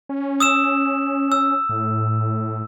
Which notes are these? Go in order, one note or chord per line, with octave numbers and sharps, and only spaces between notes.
C#4
D#6 E6 E7
E6
A2